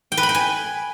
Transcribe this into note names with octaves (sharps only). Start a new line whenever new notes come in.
G5
B4
B5
G5
G#5